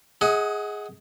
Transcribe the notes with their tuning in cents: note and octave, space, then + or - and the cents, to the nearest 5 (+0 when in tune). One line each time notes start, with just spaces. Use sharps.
G#4 +0 D#5 +35 F#5 +0